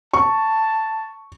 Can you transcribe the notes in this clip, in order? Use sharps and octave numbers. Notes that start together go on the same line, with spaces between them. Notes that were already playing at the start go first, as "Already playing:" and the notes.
A5 C#6